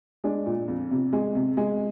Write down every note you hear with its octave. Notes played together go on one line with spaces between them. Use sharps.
G#3 D4
A#2
F2
C3
G#3
C3
G#3